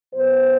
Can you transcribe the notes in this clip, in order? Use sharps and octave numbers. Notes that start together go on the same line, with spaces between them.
B2 F#3 B3 C5